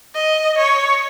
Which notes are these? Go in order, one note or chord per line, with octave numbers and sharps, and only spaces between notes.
D#5
C#5